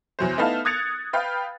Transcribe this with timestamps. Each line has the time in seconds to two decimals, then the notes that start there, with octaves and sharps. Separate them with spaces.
0.19 E2 F#3 C5
0.38 A3 B3 D#4 E4 F5 A5
0.65 D#6 F#6 G#6 A6 C#7 F7
1.13 B4 F5 G5